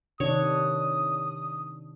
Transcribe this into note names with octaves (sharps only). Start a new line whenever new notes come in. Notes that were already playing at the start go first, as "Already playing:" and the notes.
C3 D#3 D4 C#5 D#6